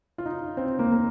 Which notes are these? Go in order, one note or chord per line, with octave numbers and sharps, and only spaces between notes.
F4
D#4
C4
A#3
A#3